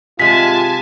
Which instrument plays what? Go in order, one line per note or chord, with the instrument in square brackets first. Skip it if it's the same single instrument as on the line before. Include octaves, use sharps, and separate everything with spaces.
[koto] C3 G#3 [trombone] F4 [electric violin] G#5 A5 [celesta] B6